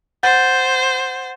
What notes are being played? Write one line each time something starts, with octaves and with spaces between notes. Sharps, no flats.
C5 F#5 G6 A6